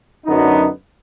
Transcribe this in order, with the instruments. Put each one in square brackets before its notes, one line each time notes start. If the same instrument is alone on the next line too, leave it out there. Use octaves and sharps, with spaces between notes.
[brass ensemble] F#2 D3 F#3 B3 D#4